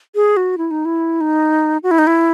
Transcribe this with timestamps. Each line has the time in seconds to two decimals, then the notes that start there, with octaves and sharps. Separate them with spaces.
0.15 G#4
0.37 F#4
0.58 E4
0.71 D#4
0.85 E4
1.21 D#4
1.83 F#4
1.91 E4
1.99 D#4
2.07 E4